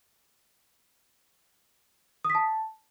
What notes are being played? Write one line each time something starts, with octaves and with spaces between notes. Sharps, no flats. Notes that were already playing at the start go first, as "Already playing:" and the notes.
D#6
B6
A5